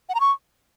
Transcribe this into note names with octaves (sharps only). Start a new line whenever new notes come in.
F#5
A#5
C#6